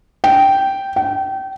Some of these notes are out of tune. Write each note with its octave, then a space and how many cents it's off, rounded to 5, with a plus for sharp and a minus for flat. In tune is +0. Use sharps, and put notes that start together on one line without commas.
G5 -10
G5 -30